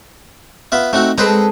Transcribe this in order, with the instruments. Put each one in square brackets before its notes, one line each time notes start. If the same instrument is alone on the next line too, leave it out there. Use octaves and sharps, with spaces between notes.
[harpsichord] B3 F4 E5
[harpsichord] A3 C4 F#4 [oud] D#4
[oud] G#3 C4 A4 [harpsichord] B4 C5 A#5